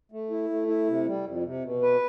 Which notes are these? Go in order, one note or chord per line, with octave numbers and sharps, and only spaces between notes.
A3
E4
A3
E4
C3
G3
F2
C3
B2
B4